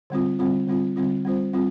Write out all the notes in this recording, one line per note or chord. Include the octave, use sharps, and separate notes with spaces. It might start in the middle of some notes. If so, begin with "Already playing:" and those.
D3 G3 C4 F4
D3 G3 C4 F4
D3 G3 C4 F4
D3 G3 C4 F4
G3 C4 F4 C5
G3 C4 F4